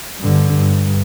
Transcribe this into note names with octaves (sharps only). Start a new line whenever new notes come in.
G2 D3
G2